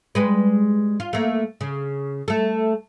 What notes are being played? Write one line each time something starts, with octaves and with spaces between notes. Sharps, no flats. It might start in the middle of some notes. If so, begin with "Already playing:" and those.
G3 G#3 B4
F4
A3 A#3
C#3
A3 A4